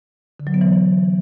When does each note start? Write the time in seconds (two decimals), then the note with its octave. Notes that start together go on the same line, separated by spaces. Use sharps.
0.40 D3
0.47 F#3
0.54 B3
0.61 E3